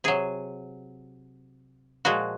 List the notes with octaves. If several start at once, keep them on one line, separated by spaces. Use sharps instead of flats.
C3 F#3 G#4
A#2 F3 G#3 F#4